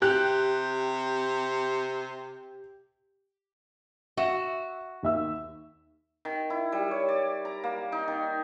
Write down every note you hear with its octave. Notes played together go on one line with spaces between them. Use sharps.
C3 G4 F#6
F#4 E5 E7
D#2 E5 E6
D#3
E4
G3
C#5
D5
A#5
A#3
D#4
D#3